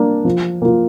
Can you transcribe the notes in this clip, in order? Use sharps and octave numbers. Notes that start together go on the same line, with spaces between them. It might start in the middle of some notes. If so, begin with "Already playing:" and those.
Already playing: A#3 D4
F3
A#3 F4